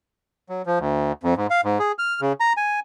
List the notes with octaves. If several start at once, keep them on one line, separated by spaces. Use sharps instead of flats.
F#3
F3
D2
F2
G#2
F5
G#2
G#4
F6
C#3
A#5
G#5